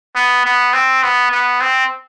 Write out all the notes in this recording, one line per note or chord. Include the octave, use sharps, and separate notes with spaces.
B3
B3
C4
B3
B3
C4